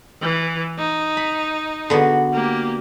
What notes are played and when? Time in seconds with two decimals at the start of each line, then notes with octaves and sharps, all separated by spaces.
0.22 E3
0.78 D#4
1.17 B5
1.90 D3 B3 F#4
2.33 A#3 G4